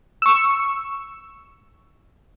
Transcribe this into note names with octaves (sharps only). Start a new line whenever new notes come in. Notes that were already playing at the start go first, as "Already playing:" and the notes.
C#6 E6